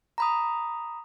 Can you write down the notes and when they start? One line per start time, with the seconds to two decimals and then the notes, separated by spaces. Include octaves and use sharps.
0.18 A#5 B5 D#6